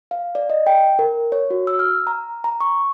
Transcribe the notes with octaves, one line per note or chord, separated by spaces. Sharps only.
F5
D5
D#5
G5
A#4
C#5
F#4
E6
F6
A#5
A#5
C#6